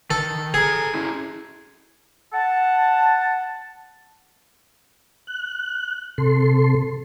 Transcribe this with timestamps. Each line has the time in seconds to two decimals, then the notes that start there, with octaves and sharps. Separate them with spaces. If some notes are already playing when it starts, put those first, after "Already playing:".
0.10 D#3 A4
0.54 G#4 A4 A#5
0.95 C#4 E4
2.33 F#5 A5
5.27 F#6
6.18 C3 A4 C6